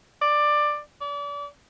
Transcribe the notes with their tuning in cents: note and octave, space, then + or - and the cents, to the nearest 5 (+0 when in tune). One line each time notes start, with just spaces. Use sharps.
D5 +15
D5 -35